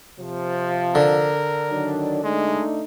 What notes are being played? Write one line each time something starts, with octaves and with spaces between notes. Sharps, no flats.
C3 F3
D3 A#4
D#3 F#3 D4
G#3 A3 D4 D#4